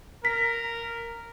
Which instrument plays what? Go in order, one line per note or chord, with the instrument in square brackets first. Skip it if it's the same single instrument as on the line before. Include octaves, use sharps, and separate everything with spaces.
[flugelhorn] A#4 [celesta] B6